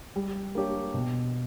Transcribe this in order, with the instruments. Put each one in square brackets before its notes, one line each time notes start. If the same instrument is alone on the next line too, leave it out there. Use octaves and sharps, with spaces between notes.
[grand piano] G3
A#3 D4 G4 C#5
B2